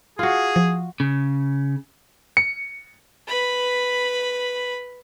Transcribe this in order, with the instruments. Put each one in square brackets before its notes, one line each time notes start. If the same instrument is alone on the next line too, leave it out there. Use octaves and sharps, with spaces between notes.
[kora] F4 F#4 [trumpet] G#4
[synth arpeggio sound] F3
[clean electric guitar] C#3
[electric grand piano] C#7
[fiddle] B4 B5